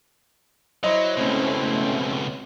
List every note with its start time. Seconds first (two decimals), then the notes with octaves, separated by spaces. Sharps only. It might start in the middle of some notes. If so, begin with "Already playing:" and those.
0.84 F#3 E4 C5 D#5
1.17 C#2 B2 A3 C4 C#4